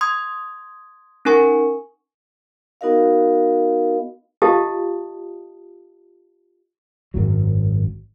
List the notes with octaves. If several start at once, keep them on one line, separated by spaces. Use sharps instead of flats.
C6 D#6 G#6
C#4 D#4 A#4 G#5 C#6
B3 D#4 F#4 A#4 D#5 F5
F4 G4 D#5 F5 A5 D#6
G#1 F#2 F#3